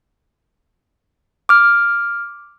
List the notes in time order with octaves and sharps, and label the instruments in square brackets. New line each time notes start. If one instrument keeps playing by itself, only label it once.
[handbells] D6 F6